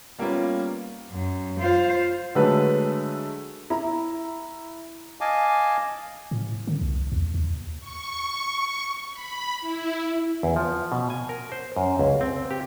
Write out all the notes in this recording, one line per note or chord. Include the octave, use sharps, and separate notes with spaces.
G3 A#3 B3 C#4 F4
F#2
F4 C5
D3 F#3 G#3 A3 A4 B4
E4 A#5
D#5 F5 G#5 A5 D6
A2
D3
C2
E2
D#2
C#6
B5
E4
E2
F3
B2
G#5
A#4
C5
F#2
C#2
C4
G4